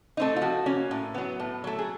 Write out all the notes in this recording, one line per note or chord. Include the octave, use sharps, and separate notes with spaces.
A3 C4 D#4
F4
F3 F#4
A#3 C#4
A2
F#3 B3
A2
F#3 A3
G#4